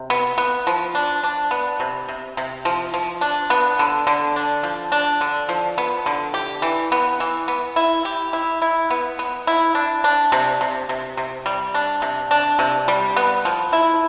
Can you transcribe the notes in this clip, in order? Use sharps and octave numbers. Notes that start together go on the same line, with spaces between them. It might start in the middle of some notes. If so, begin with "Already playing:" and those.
Already playing: C3
B3
B3
F3
D4
D4
B3
C3
C3
C3
F3
F3
D4
B3
D3
D3
D4
F3
D4
D3
F3
B3
D3
G4
E3
B3
E3
B3
E4
G4
E4
E4
B3
B3
E4
D4
D4
C3
C3
C3
C3
G3
D4
C3
D4
C3
G3
B3
F3
E4